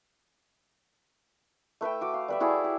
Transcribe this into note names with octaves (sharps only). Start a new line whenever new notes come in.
A3 B4 E5 G5
F#4 D6
F5
G3 B4 E5
E4 F#4 G#4 A5
G4